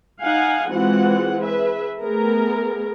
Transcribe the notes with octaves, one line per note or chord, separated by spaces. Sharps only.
D#4 F5 F#5 G#5
E3 G#3 C4 F4 F#4 F#5
G#4 B4 E5
A3 B3 G#4 A#4